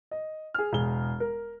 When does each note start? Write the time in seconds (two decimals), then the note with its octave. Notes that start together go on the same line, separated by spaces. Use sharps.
0.11 D#5
0.54 G#4 F6
0.73 E1 G#4 G7
1.20 A#4